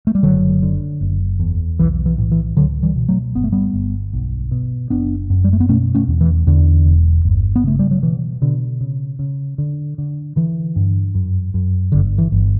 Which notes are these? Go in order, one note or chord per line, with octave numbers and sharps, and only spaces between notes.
A3
G3
F#1 D3 F#3
D3
F#1
E2
B1 E3
E3
A2
E3
C#2 D3 F#3
E3 G3
B2
F#3 A3
G1 B3
A3
G3 B3
G1
B1
B2
F#1 B3 D4
F#2
G3
A3
B3
B2 A3 C#4
A3 C#4
E2
E3
E2 D3
E1
G1
B3
C#3 A3
G3
F#3
B2 E3
B2 D3
C#3
C#3
D3
D3
D3 E3
G2
F#2
F#2
G1 D3
E3
G1